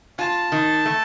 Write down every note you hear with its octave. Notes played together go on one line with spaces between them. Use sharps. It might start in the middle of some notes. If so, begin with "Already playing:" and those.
F4 A5
D#3
A3